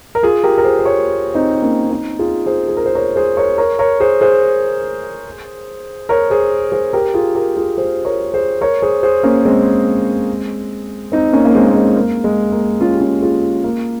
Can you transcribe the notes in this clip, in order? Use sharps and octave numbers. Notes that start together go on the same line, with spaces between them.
A#4
F4 G#4
G4 A#4
A#4
G#4 C5
C5
A#4 C#5
C4 D#4
A#3 C#4
C4 D#4
F4 G#4
G#4 C5
G#4
A#4
C5
A#4 C#5
G#4 C5
A#4 C#5
A#4 C#5
A#4 C#5
G#4 C5
G#4 C5
A#4 C#5
G#4 C5
G#4 C5
G4 A#4
F4 G#4
G4 A#4
F4 G#4
G#4 C5
A#4 C#5
G#4 C5
A#4 C#5
G#4 C5
G#4 C5
A#3 C#4
G#3 C4
C4 D#4
A#3 C#4
A#3
G#3 C4
A#3
G#3 C4
A#3
G#3
A#3
C#4 F4
G4
C#4 F4
F4 G#4
A#3